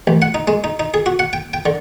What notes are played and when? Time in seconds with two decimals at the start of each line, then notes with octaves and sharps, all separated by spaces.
0.07 A1
0.22 F#5
0.34 D#4
0.48 G#3
0.64 D#4
0.80 D#4
0.94 G#4
1.06 F#4
1.19 F#5
1.33 G5
1.53 G5
1.66 D3